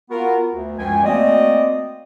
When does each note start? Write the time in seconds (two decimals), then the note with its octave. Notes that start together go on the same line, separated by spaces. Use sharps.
0.10 B3 F4 F#4 A#4
0.52 D2
0.78 C#2 F#2 F3 G5 G#5
1.03 A3 A#3 C4 F#4 D5 D#5